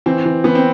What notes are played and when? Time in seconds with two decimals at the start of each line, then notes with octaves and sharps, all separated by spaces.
0.06 E3 C4
0.25 E3
0.44 E3 B3
0.55 C4